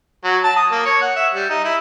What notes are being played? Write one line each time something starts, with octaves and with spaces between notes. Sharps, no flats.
F#3
A5
D#6
A#3
C#5
F#5
E5
G3
D#4
E4